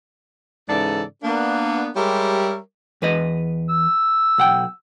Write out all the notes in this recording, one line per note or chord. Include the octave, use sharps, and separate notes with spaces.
G#2 C#3 E3 A4 D5
A#3 B3 D4
G3 G#3 G4 A#4 C#5 E5
E2 B4 D#5
E6
B1 F#5 G5